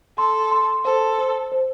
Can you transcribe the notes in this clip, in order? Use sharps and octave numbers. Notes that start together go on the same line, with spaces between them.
A4 C6
C6
A4 C5
C5
C5